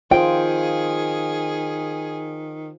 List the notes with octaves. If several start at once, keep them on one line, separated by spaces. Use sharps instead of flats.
D#3 F4 G#4 C5 G5